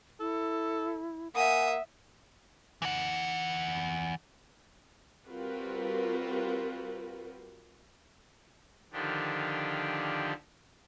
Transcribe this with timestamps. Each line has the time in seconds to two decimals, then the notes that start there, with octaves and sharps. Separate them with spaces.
0.20 E4 A4
1.35 A#3 E5 F#5 G#5 D#6
2.82 E3 F#5
5.26 G3 C4 F4 F#4 A#4 B4
8.92 D3 D#3 F3 D4 G4